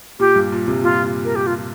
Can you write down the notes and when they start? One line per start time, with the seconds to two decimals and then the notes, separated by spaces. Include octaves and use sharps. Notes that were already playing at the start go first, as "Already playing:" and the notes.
0.20 A#2 G4
0.36 G2
0.52 A#2
0.68 G2 C3
0.83 A#2 F4
1.25 A#4
1.36 G4
1.47 F4